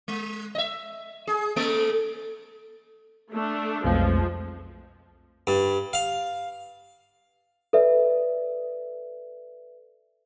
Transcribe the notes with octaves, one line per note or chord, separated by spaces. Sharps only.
G#3
D#5 E5
G#4
A3 A#3 A4
A3 D4
B1 F2 F3 G#3 A3
G2
F5
A4 B4 D5 E5